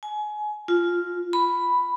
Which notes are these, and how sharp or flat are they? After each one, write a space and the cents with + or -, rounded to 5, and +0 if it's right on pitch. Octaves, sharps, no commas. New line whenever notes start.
G#5 +25
F4 -5
B5 +5